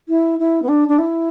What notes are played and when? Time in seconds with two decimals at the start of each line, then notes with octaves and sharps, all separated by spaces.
0.08 E4
0.39 E4
0.62 B3
0.68 D4
0.88 D4
0.98 E4